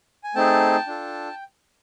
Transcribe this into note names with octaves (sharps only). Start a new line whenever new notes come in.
G#5
A3 C4 D#4 G#4 G5 A5
D4 F4 A4